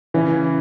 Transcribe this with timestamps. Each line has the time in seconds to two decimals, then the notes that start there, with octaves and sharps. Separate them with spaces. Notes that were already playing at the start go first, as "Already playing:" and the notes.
0.14 C#3 E3 C#4